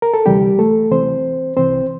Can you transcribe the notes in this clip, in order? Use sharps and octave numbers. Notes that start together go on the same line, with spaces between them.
A#4
A4
D2 C3 E3 G3 G4
A3 A4
D2 C3 E3 C4 C5
C2 C3 E3 C4 C5